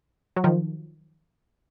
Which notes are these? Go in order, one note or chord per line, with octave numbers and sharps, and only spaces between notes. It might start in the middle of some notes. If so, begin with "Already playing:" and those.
F#3
D#3 F3